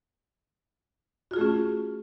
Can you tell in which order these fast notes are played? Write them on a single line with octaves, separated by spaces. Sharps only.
F#4 F4 G#4 A3 C#4